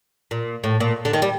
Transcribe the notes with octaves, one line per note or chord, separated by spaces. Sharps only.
A#2
A2
A#2
D3
D#3
G3